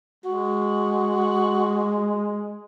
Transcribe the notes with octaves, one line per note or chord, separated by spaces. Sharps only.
G#3 F#4